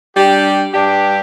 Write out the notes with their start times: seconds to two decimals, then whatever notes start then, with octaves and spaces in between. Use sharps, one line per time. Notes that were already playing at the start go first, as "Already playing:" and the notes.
0.15 G3 D4 G4
0.74 G2 G3 D4 G4